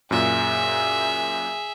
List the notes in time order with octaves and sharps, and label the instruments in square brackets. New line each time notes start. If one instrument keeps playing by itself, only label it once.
[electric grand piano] F#2 A#2 [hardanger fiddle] G#4 E5